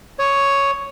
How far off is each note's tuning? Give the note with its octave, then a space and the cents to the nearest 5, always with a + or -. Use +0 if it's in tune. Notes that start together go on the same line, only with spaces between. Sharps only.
C#5 +5 D#6 +0